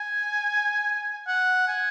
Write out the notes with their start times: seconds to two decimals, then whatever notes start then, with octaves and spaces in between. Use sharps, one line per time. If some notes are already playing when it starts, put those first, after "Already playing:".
Already playing: G#5
1.27 F#5
1.68 G#5